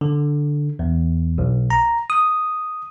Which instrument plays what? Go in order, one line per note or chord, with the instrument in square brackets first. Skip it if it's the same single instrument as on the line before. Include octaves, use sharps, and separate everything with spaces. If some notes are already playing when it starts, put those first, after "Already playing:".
[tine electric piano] D3
E2
B1
A#5
D#6